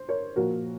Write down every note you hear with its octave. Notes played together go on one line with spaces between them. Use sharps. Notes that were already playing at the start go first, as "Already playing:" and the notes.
Already playing: C5
A#4 C#5
A#2 F3 F#4 A#4